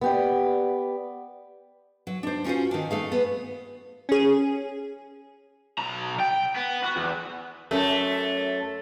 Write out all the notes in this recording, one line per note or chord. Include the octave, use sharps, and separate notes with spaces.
B3 G4 D5
F#3
D4 C5
C#4 F4 F#4 C5
D#3 D4
A3 G#4 F5
B3
C#4 G#4
B1 A#5
G5
B3
F#4
E2
F#2 A3